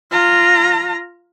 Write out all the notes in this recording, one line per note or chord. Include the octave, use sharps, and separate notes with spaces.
F4 A#5